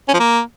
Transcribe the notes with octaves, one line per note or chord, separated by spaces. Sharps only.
C#4
F3
A#3